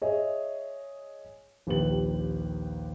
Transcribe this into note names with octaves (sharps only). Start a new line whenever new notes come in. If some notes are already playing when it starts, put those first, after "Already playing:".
G#4 C#5 D#5 E5
A#1 D#2 G4 B4 F#7